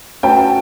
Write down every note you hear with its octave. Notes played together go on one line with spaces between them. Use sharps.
A3 C#4 F#4 B4 G5 A5